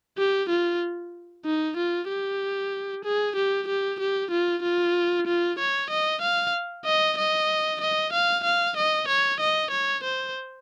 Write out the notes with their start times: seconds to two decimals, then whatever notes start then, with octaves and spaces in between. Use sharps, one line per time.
0.18 G4
0.49 F4
1.45 D#4
1.77 F4
2.09 G4
3.05 G#4
3.36 G4
3.68 G4
4.00 G4
4.31 F4
4.63 F4
5.27 F4
5.59 C#5
5.90 D#5
6.21 F5
6.85 D#5
7.18 D#5
7.81 D#5
8.13 F5
8.44 F5
8.76 D#5
9.08 C#5
9.40 D#5
9.71 C#5
10.04 C5